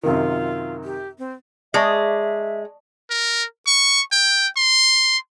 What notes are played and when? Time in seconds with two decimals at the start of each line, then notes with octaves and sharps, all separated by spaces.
0.03 F#2 C3 D#3 F4
0.84 G4
1.18 C4
1.74 G#3 D5 E5 A5 C#6
3.10 A#4
3.67 C#6
4.12 G5
4.57 C6